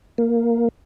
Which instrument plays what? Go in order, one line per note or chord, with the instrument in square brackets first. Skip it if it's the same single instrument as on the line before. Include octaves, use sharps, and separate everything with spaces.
[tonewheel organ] A#3